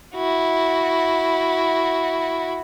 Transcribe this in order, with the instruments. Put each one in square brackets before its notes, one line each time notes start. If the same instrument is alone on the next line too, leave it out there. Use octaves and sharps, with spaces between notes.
[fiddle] E4 F#4